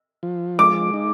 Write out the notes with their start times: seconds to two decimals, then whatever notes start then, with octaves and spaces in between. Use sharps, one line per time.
0.23 F3
0.59 G#3 D6
0.94 D#4